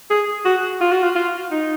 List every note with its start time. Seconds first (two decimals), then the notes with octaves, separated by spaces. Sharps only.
0.10 G#4
0.45 F#4
0.81 F4
0.92 F#4
1.04 F4
1.15 F4
1.51 D#4